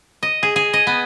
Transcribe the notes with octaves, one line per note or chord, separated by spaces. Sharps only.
D#5
G#4
G#4
D#5
B3